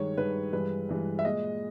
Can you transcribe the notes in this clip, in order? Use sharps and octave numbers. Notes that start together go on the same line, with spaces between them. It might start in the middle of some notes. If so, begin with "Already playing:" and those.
Already playing: G2 D#3 G#3 C#5
G2 D#3 G#3 B4
G2 E3 G#3 B4
G2 E3 G#3
E5
A#2 G#3 D#5